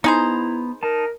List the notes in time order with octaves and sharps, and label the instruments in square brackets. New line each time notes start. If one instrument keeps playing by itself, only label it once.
[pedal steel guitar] B3 A#5 [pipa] D#4 G#4 C5 [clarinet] E4
[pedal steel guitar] D#4 A5 [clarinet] A#4